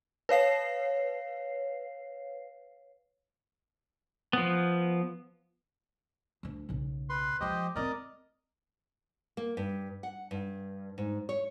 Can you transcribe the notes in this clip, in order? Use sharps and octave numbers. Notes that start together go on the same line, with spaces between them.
B4 C#5 F5 C7
F3 B3
D2 D4
B1 C#3
B4 C6
F3 G#3 G4 C5 D#5
A3 C4 A#4 D5 D#5
A#3
G2
F#5
G2
G#2
C#5